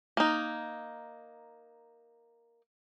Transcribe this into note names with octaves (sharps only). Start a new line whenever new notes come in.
A#3 D#4